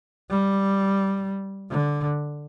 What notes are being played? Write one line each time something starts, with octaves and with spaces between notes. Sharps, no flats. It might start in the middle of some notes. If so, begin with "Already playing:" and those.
G3
D3